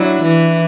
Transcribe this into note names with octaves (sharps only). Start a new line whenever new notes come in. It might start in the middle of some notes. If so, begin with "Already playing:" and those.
Already playing: F#3 D4 E4
E3